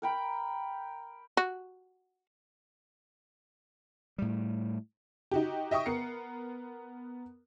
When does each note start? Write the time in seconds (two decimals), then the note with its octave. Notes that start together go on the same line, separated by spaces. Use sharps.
0.02 A#4 G5 B5
1.37 F#4
4.18 A2 G3
5.32 D#4 F#4 G4
5.71 D#5 E5 G5 C#6 D#6
5.86 B3 A#4 C7 C#7